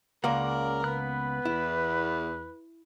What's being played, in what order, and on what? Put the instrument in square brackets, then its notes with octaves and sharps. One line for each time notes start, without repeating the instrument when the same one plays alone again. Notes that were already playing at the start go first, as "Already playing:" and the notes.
[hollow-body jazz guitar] C#2 A#3 [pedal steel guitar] C#3 D5 F#5 [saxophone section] A#4
[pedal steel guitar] B3 F#6 [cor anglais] B4
[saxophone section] E2 [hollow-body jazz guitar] E4